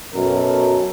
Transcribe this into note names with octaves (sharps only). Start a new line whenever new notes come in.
F#2 B2 F#4 A4 A#4